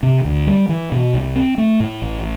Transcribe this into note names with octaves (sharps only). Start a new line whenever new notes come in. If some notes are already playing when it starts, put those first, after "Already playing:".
C3
D2
G3
E3
B2
C2
C4
A3
A2
A1